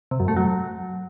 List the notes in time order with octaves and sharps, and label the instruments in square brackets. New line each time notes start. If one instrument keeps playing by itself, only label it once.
[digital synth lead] C3
F#2
A3
F#3